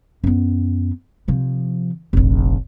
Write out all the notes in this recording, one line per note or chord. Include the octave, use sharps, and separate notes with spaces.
F#2 B3
C3 F3
F1 A#1